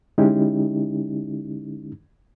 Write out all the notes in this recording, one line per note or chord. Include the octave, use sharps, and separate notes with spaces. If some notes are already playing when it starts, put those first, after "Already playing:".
D3 G#3 C#4 D#4 E4 G4